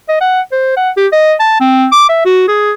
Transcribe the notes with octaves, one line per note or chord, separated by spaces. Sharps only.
D#5
F#5
C5
F#5
G4
D#5
A5
C4
D6
E5
F#4
G#4